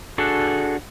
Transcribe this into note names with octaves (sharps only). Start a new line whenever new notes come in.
D4 F#4 G#4 A4